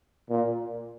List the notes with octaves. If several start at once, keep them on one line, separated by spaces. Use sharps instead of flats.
A#2